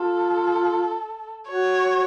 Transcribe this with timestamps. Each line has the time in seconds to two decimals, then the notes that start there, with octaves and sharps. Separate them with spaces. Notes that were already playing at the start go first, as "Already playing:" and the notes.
Already playing: F4 A4
1.48 F#4 C#5